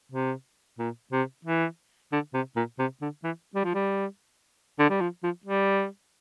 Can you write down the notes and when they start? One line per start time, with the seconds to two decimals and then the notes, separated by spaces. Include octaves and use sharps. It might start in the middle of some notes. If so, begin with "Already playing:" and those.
0.12 C3
0.79 A#2
1.12 C3
1.45 E3
2.12 D3
2.34 C3
2.56 A#2
2.79 C3
3.01 D3
3.24 E3
3.55 G3
3.64 F3
3.74 G3
4.79 D3
4.90 G3
5.01 F3
5.23 F3
5.45 G3